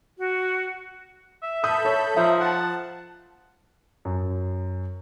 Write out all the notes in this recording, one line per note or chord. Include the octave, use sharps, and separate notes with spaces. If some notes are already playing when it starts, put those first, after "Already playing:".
F#4
E5
A4 B5 D#6 G6
C#5
F3 D#4 E5
F#5 A5
F#2